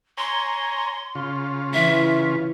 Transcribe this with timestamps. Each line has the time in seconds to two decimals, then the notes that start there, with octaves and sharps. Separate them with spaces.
0.18 C#5 G#5 A#5 C6
1.15 C#3 F4
1.73 E3 E5